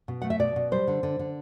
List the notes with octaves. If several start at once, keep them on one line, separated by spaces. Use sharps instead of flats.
B2
A3 F#5
E5
B2 D5
B2
G3 C5
D3
D3
D3